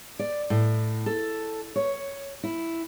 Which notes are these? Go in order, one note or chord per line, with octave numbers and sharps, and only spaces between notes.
D5
A2
A4
C#5
E4